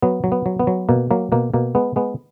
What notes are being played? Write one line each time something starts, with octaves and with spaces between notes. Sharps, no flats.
F#3 B3
F#3
B3
F#3
B3
F#3
B2 A#3
F#3 A#3
B2 A#3
B2 A#3
G#3 B3
G#3 B3